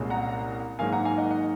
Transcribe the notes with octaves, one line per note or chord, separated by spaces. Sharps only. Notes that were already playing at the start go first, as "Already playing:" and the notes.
Already playing: C2 A#2 G#3 C#4
F#5 A#5
G#2 D#3 F#3 A#3 F5 G#5
F#5 A#5
F5 G#5
D#5 F#5
D#5 F#5